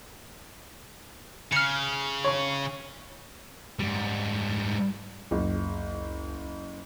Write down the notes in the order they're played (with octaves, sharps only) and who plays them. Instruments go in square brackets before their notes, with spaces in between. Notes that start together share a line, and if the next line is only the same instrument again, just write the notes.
[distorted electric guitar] C#3 [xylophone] F6 C#7
[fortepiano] C#5 C#6
[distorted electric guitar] G#2 G3
[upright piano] F#1 [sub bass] C#2